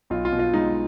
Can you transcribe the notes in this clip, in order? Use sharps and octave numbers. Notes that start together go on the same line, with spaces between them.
B1 F4
F4
B2
F4
G#3 D#4